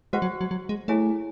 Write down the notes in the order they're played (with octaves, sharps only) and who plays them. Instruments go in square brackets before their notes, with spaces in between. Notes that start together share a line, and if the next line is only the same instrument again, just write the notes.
[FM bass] G#3 [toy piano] F#4 C5 F#5 C#6
[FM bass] F#3
F#3
F#3
G#3
[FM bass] A3 [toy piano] E4 G#4 C#5 G#5